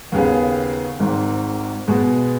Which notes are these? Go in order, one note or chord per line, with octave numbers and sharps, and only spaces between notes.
D#2 C#3 B3 G#4
G#1 G#2 D#3
B2 G#3 B3